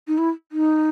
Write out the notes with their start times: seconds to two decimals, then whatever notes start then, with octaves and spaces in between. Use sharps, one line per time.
0.08 D#4
0.18 E4
0.52 D#4